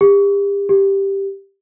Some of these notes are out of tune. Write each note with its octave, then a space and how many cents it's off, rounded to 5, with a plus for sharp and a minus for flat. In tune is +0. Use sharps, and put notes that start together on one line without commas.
G4 +35
G4 +0